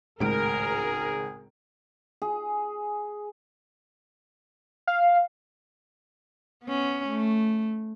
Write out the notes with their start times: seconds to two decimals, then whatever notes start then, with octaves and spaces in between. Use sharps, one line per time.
0.20 G#1 C#2 A2 G#3 A3 G#4 A#4 D7
2.22 G#4
4.87 F5
6.64 B3 C#4
7.08 A3